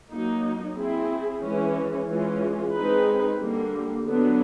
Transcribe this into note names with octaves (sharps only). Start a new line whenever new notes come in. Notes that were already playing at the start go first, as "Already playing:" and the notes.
F#3 A#3 D#4
C4 E4 G#4
E3 G#3 C#4
E3 G#3 C#4 F4
G#3 C4 D#4 G#4 B4
D3 G3 A#3
D3 F#3 B3 D4